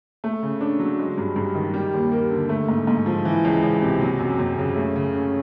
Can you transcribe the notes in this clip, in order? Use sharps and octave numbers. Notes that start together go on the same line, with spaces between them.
A3
C#3
D4
F#3
G#3
G2
G2
D#3
G3
D#2
A#3
D3
A3
G#2
G#2
F3
E3
C#2
C#2
C3
F#3
F#2
F#2
C#3
A3
C#3
C#4